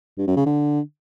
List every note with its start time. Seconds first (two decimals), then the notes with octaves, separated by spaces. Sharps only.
0.18 G2
0.27 F#2
0.36 C#3
0.46 D3